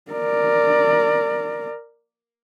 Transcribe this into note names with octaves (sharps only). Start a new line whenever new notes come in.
A#4 D5